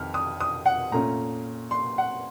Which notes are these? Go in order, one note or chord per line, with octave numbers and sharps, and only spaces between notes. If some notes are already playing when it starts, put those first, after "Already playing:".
Already playing: F2 D#3 F6
D#6
D#6
F#5
A#2 A3 C#4 A#5
C6
F#5